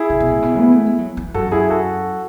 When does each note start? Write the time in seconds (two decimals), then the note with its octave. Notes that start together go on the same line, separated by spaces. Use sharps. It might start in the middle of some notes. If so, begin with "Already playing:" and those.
Already playing: E4 G#4
0.10 C#3
0.20 B2
0.32 A2
0.42 B2
0.59 B3
0.72 A3
0.86 G#3
0.98 F#3
1.17 E3
1.34 F#2 F#4 A4
1.52 E4 G#4
1.70 F#4 A4